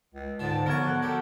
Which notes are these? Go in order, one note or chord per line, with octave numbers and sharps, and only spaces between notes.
C#2
G#2 D3 A5
D3 F3 F#3 B3 A#4 C#6
F#5
F#3 G4 A4